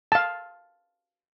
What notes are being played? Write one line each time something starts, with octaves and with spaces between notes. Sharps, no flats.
F5 A5